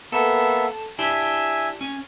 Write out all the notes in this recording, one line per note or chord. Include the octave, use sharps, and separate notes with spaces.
A#3 B3 A4 E5
D4 E4 G4 E5 G#5
C#4